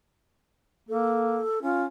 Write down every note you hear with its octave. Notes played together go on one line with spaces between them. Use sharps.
A#3 A4
C#4 F4